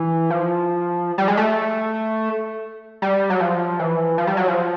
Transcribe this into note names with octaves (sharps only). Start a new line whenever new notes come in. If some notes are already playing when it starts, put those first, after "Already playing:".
Already playing: E3
F3
G3
G#3
A3
G3
F#3
F3
E3
F3
G3
F#3
F3